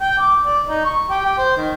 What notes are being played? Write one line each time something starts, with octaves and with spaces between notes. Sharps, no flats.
G5
D6
D5
D#4
C#6
G4
G4
C5
D#3